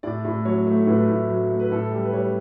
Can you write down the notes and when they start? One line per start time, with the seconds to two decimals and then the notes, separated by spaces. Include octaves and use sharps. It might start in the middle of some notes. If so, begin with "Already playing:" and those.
0.03 A2 D5
0.25 A2
0.45 F#3 C#5
0.67 A3
0.87 A2 B4
1.09 A2
1.30 F#3
1.50 A3
1.60 B4
1.72 A2 A4
1.91 G3
2.04 B4
2.13 G3 C#5